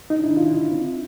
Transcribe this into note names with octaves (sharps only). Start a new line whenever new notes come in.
D#4
D4
E4
D#4
F4
E4
F4
E4
C4